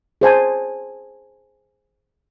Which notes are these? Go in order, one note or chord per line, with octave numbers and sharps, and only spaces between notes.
G#4 C5 G#5 A5